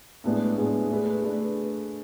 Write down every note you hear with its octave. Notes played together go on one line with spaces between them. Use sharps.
A2 G#3 B3 D4 G#4
A2 G#3 B3 D4 G#4
A3 D4 G#4 B4
A3 D4 G#4 B4